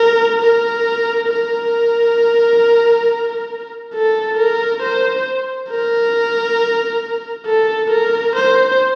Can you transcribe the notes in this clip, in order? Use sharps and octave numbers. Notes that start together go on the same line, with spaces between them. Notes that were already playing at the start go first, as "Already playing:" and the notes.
Already playing: A#4
A#4
A#4
A4
A#4
C5
A#4
A4
A#4
C5